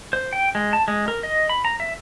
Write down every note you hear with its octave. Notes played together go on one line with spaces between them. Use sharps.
C5
G5
G#3
A5
G#3
A#4
D#5
B5
A#5
E5